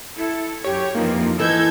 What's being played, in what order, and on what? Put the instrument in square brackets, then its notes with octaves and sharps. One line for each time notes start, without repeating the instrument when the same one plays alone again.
[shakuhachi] E4 [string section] A4
[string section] F#2 [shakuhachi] G4 [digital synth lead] C#5
[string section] F2 E3 F3 [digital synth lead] A#3 [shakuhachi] D#4
[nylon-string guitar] E3 [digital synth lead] A4 [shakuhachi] D#5 [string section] E6 G6 G#6